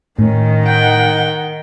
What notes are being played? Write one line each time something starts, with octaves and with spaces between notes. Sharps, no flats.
A2 D#3 C#4
F#5 G5